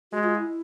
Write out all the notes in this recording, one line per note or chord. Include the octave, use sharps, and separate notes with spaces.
G#3 F#4
F4
E4